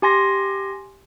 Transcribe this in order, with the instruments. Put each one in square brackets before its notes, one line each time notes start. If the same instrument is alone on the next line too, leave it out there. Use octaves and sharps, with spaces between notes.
[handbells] G4 G#5 C6 A#6